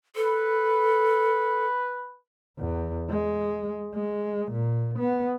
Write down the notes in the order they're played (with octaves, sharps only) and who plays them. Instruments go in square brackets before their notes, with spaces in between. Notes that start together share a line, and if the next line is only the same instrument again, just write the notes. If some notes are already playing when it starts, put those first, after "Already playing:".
[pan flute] A4 [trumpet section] B4
[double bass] E2
G#3
G#3
A#2
B3